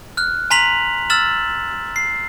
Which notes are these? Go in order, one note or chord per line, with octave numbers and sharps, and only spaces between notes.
F6 F#6
G#5 A#5 C6 B6 F7 F#7
E6 F6 A6 E7 F#7
C7